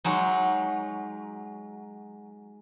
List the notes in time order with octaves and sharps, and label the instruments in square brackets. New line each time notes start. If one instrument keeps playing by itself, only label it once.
[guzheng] F#3 G#3 D#4